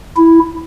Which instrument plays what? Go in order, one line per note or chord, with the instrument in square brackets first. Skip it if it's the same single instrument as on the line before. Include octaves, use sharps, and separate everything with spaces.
[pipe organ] E4